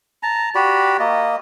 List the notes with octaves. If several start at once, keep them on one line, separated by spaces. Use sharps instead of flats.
A5 A#5
F#4 G4 D5 B5
A#3 D#5